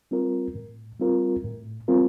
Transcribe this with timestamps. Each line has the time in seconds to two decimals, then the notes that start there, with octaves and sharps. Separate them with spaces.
0.11 G3 C4 F4 A#4
0.55 A2
1.00 G3 C4 F4 A#4
1.44 A2
1.88 G3 C4 F4 A#4